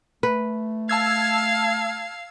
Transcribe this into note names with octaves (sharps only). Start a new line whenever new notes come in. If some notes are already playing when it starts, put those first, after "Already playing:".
A3 B4
F5 A5 E6 G#6